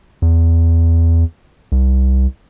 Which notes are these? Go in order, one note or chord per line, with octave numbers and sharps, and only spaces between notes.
E2
C2